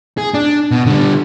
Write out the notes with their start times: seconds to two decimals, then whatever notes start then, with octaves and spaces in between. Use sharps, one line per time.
0.18 G#4
0.34 D4
0.71 B2
0.86 D3 G3